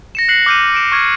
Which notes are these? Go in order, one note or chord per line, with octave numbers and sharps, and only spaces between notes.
A#6 C#7 E7
F#6 C7 C#7 F#7
D6 F6 G6 A#6 D#7
D7 E7
C#6 F6 G#6